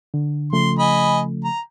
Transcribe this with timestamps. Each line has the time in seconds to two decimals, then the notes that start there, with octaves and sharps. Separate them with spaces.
0.14 D3
0.53 C#3 F3 A3 C6
0.79 D#5 G#5 B5
1.44 A#5